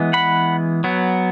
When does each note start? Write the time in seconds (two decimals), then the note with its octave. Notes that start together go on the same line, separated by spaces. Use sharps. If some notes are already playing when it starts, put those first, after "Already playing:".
Already playing: E3 G#3 B3
0.13 F#5 B5
0.84 F#3 B3